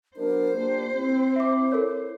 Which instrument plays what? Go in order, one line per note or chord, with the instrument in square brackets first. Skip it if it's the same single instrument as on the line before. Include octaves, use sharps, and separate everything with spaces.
[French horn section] F#3 B3 D4 [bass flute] A#4 [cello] C5
[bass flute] A#3 [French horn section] D4 F4 G4
[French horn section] C4 [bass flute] E4
[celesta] E5 D6
A4 A#4 C#5